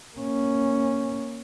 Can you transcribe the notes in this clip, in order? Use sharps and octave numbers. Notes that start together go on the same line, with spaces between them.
A#3 C#4